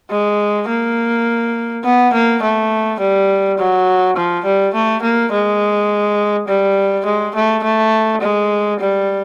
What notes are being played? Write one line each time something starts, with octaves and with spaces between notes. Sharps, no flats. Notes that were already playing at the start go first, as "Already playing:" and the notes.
G#3
A#3
B3
A#3
A3
G3
F#3
F3
G3
A3
A#3
G#3
G3
G#3
A3
A3
G#3
G3